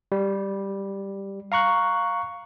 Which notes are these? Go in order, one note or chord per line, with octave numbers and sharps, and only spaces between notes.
G3
F5 A#5 C#6 F#6